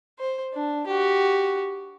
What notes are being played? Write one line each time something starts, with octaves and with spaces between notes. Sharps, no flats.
C5
D4
F#4 G4